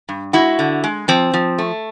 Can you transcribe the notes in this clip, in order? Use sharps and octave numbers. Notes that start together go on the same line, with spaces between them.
G2
G#3 E4 F#4
D3
G#3
F3 C4
F3
A3